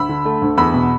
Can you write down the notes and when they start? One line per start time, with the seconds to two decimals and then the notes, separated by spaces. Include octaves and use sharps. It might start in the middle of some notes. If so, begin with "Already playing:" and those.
Already playing: D2 B5 E6
0.09 D3
0.25 A3
0.42 D2
0.57 E2 B5 E6
0.74 B2